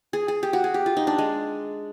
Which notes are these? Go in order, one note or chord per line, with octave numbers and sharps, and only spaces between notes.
G#4
G#4
G4
F#4
G#4
G4
F4
D#4
D4
G#3